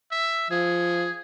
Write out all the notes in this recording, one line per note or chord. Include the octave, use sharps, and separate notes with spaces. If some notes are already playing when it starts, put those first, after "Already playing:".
E5
F3 G#4